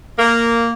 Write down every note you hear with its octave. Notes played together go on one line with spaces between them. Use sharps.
A#3